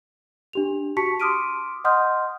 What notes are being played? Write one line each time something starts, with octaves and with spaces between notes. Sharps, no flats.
D4 G4 F7
F#4 G4 A5 C#6 B6 C#7
C6 D6 D#6 F6 D7 D#7
D#5 F#5 C6 D#6 F6 G6